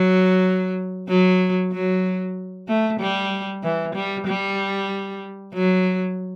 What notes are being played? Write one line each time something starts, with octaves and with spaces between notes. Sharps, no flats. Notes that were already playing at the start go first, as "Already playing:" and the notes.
Already playing: F#3
F#3
F#3
A3
G3
E3
G3
G3
F#3